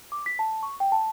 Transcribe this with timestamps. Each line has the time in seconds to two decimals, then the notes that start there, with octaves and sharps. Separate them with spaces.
0.12 D6
0.26 B6
0.39 A5
0.63 C#6
0.80 G5
0.92 A5